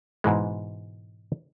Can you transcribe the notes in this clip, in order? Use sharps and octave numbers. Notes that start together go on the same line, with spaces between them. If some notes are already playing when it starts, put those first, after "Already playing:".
G#2 B2 E3 G#3